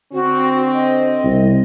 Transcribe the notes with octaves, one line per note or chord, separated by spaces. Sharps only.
D3 C4 F#4
D#5
C2